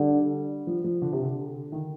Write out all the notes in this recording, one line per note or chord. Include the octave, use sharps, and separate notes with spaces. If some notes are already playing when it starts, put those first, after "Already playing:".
Already playing: D3 G3
F3
F3
D3
C3
D3
D#3